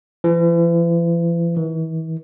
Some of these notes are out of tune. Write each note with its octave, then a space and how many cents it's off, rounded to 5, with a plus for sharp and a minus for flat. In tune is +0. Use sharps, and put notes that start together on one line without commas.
E3 +40
E3 -40